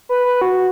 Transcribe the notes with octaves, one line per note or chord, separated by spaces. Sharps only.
B4
B4
F#4